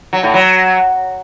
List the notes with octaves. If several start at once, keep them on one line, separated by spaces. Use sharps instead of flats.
F#3
A2
F#3